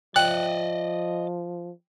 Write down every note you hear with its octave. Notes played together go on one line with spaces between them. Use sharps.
F3 D5 D#5 G5 F#6